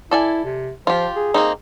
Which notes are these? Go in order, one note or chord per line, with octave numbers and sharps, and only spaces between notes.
E4 A4 D5 G#5
C3
F3 F4 G4
G#4
A#3 C4 D#4